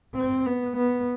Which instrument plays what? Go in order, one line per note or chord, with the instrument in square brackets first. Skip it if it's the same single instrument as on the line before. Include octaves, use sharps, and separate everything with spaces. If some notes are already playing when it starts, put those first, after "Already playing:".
[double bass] C4
B3
B3